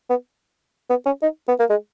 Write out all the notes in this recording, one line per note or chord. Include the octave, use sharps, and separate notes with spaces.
B3
B3
C#4
D#4
B3
A#3
G#3